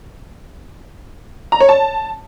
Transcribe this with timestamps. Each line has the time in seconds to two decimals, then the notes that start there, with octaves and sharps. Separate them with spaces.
1.52 A#5
1.60 C#5
1.69 A5